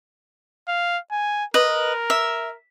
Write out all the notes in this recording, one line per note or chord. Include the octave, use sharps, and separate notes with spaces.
F5
G#5
A#4 B4 D#5
E5